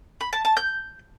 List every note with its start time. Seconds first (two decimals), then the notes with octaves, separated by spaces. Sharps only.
0.21 B5
0.33 A5
0.45 A5
0.57 G6